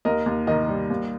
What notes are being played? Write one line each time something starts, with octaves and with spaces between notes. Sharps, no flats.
D#2 A#4 D#5
D#2
D#3 A#4 D#5
G3
D#2